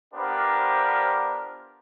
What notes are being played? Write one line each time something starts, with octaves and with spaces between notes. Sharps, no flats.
B3 D4 F4 G4 A#4 C5